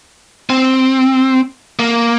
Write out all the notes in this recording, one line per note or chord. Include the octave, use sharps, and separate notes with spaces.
C4
A#3